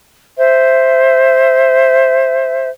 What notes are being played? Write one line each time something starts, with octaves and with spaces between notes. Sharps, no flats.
C5 E5